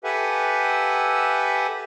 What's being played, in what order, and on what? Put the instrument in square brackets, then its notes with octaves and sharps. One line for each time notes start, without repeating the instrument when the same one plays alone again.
[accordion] G4 A4 B4 E5 F#5 G#5